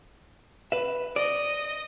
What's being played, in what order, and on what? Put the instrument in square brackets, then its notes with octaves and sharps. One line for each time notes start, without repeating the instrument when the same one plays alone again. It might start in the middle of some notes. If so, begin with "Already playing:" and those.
[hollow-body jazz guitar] B4 E5
[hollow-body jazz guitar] D5 [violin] D#5